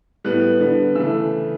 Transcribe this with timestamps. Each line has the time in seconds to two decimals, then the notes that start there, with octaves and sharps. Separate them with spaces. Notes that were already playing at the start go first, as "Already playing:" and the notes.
0.24 A2 G3 B3 F#6
0.60 D3 G3 B3
0.95 C#3 E3 A3 E6